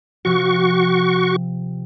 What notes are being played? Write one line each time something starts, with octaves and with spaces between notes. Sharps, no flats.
C3 F3 F#4 C#6